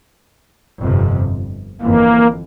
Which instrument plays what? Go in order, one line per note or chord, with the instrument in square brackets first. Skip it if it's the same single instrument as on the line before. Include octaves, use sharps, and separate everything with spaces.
[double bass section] G1 F2 C3
[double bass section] G1 F2 E3 [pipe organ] A#3